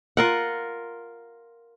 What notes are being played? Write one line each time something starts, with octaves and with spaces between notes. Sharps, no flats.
F4 A#4 F#5